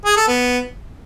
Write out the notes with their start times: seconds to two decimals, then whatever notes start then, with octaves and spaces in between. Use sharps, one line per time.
0.05 G#4
0.16 A4
0.28 B3